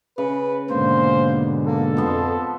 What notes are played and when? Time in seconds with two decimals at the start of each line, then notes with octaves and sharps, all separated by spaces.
0.18 C#3 B4
0.70 G#2 B2 D3 A#3 C5
1.66 A#3 A4
1.97 F2 F3 B3 C5